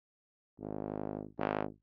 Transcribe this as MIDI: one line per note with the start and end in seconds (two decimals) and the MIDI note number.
0.59 1.25 32
1.38 1.65 32